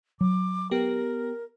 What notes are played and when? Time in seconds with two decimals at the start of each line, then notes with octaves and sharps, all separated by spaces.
0.21 F#3 D6
0.71 B3 G4 A#4